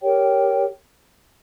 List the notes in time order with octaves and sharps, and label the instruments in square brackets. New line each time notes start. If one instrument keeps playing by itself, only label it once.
[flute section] G4 A#4 C#5 G5